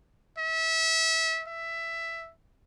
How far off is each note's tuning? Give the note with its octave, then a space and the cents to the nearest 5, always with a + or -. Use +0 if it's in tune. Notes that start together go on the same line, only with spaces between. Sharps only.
E5 -25
E5 +10